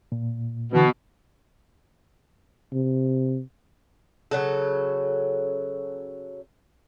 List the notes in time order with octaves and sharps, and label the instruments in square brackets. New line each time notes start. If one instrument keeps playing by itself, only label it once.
[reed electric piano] A#2
[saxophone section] B2 [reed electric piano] D3 E3 B3
[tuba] C3
[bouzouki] C#3 F#3 A4